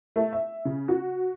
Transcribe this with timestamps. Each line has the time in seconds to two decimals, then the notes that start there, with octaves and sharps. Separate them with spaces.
0.16 A3
0.33 E5
0.65 C#3
0.88 F#4